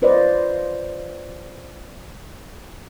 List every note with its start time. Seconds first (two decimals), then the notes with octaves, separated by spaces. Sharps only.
0.02 F4 B4 C5 D5 D#5